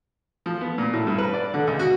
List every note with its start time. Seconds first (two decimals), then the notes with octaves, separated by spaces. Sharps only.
0.46 F3
0.61 B3
0.78 A#2
0.93 A2
1.07 G2
1.18 B4
1.34 D5
1.54 D3
1.67 C#2
1.79 F#4